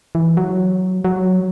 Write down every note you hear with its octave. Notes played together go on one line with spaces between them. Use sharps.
E3
F#3
F#3